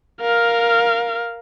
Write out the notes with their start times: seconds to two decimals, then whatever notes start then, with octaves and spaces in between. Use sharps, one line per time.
0.21 A#4 F5